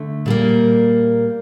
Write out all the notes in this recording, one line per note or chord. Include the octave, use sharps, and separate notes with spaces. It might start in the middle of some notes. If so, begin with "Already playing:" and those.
Already playing: D3 A3
A#2 G3 A#3